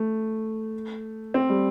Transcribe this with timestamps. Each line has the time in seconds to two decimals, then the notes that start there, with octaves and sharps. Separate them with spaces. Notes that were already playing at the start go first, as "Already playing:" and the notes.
Already playing: A3
1.34 C4
1.49 G3